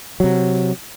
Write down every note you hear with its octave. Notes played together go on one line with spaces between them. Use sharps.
C3 F#3